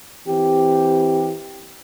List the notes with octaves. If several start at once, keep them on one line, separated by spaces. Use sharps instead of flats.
E3 C4 G4